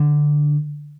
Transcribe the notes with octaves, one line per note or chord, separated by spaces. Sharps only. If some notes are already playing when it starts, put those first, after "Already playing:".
Already playing: D3